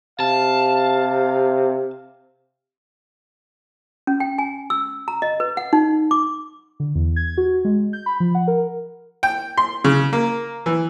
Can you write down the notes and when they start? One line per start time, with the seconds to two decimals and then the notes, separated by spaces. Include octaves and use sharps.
0.20 C3 F5 A5
4.07 C#4
4.20 G5
4.38 G#5
4.70 E6
5.08 A#5
5.22 D#5
5.40 B4
5.57 F#5
5.73 D#4
6.11 D6
6.80 D3
6.95 E2
7.16 G#6
7.38 F#4
7.65 G#3
7.93 G6
8.06 B5
8.20 F3
8.35 F#5
8.48 A#4
9.23 G5
9.58 C6
9.84 C#3
10.13 A#3
10.66 E3